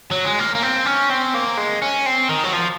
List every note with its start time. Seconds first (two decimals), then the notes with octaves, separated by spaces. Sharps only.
0.11 F#3
0.25 G#3
0.39 A#3
0.55 A#3
0.63 C4
0.86 C#4
1.10 C4
1.35 A#3
1.57 G#3
1.82 C#4
2.06 C4
2.29 D#3
2.44 F#3
2.53 F3